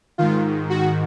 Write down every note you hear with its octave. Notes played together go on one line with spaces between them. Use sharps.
G#2 D#3 F4
F#4